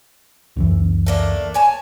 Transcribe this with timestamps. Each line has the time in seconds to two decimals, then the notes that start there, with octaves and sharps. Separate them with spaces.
0.56 C#2 F#2 E3
1.06 A3 A#3 D4
1.54 C#5 G#5 A5